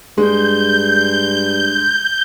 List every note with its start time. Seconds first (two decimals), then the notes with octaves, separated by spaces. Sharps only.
0.18 G2 G#3 G6